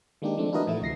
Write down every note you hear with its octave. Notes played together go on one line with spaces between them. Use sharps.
D#3 G#3 A#3 D4 D#4 G4
F3 G#3 A3 C4 D4
D4 E4 F#4 A#4 B4 D#5
A2 E3 F3 A3 E4
D2 C3 A#6 C7